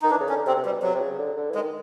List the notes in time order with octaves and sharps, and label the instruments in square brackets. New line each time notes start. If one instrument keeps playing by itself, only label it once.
[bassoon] D#3 [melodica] D#4
[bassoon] E3 [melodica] D4
[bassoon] C#3
[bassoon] D3 [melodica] C#4
[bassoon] C3 [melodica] C4
[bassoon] C3
[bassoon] B2 [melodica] G3
[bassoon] C3 [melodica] F#3
[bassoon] C3
C#3
D3
D3
E3
[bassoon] D#3 [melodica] G#3